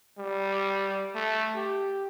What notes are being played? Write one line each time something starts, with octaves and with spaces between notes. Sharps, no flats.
G3
A3
G4